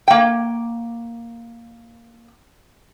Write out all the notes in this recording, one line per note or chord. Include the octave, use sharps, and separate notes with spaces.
A#3 G5